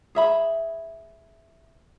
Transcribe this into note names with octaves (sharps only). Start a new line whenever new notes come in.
G#4 E5 B5